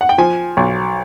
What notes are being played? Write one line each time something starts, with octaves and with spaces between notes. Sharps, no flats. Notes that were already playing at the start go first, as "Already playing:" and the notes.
F#5
G5
F3 G#5
B1